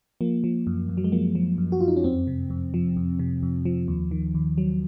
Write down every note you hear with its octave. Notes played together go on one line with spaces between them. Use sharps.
F3 A#3
F3
F#2
F#2
F#3
G#3
F3 A#3
F3
F#2
F#4
F#2 F4
D#4
C#4
F2 C4
C3
F2
F3
F2
C3
F2
F3
D#2
D#3
D#2
F#3